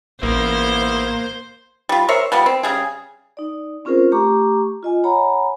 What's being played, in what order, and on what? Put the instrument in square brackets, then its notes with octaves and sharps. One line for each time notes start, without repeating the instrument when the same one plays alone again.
[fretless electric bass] A1 [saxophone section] G#2 B3 E4 [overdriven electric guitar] A#3 [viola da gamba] C5
[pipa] G3 F4
A#4 C5 C#5 E5
F3 G3 B3
C4
C#3 G3 G#4
[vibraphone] D#4 D5
C4 C#4 F4 G#4 A#4 C5
A3 G4 A#5 C#6 D6
F4 D#5 G#5
C#5 F#5 G#5 A#5 B5